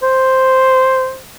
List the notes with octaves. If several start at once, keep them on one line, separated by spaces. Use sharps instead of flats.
C5